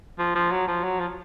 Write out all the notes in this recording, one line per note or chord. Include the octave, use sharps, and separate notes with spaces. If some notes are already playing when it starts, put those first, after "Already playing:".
F3
F3
F#3
F3
F#3
F3